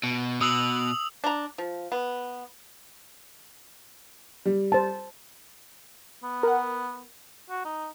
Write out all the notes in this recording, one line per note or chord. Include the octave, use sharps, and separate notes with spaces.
B2
B2 D#6 E6 F#7
D4 A#5
F3
B3
G3
C5 A5
B3
A#4 F#5
F#4
D#4